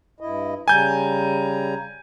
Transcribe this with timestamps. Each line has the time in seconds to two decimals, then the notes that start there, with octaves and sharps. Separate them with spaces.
0.20 G2 E4 D#5
0.68 C#3 G3 G#5 A#5 G6